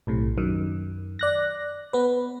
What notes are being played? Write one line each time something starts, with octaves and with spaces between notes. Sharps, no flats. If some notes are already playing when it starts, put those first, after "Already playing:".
B1 A2 C3
F#2 D#3
D5 F#6 A#6
B3 B4